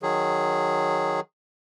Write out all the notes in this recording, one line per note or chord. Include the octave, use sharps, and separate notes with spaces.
D#3 F#3 G#4